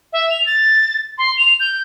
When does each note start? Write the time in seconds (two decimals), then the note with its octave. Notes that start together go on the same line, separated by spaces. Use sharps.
0.13 E5
0.30 F7
0.46 A6
1.18 C6
1.37 F7
1.60 G6